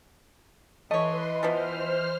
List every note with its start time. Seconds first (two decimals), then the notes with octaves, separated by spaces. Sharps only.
0.91 E3 A3 B4 C#5 D#5 C6
1.43 F3 B3 E4 C5 F6